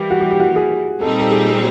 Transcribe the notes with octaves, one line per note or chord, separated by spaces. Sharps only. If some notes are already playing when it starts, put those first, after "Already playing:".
Already playing: E3 G3 A#3 G4
F#4
G4
G4
F#4
G#4
A#2 G3 C4 D#4 A4
A4
G#4